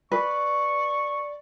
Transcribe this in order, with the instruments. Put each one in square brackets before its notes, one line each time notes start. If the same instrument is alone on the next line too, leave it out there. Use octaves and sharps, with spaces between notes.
[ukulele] B4 [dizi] D5 [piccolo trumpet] C#6